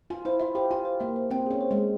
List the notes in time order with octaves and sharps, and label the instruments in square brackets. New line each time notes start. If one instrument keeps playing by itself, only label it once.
[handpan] F4 [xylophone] G#5
[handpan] E4 [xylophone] C5
[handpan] F4 [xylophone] E5
[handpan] G4 [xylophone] C5
[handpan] F4 [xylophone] G#5
[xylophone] C5
[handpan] A#3 [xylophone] E5
[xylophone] C5
[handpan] C4 [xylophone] G5
[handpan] C#4 [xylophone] G#4
[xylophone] C5
[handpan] G#3
[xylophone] G#4